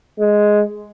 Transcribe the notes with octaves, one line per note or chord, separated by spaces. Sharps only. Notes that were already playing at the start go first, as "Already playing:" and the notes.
G#3